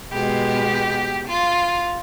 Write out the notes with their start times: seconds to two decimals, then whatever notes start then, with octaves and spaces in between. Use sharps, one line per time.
0.12 B2 G#3 B3 G4
1.26 F4